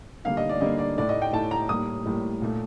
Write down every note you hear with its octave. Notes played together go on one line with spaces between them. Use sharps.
D3 G3 A#3 F5
D#5
D5
D3 G3 A#3 D#5
D5
A2 A3 D5
D#5
G5
A2 A3 A5
A#5
A2 G3 A#3 D#6
A2 G3 A#3
A#2 A3